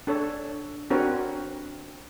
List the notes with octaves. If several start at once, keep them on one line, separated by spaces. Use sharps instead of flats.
D4 A4 C#5
C4 D4 F#4 A#4 B4 C#5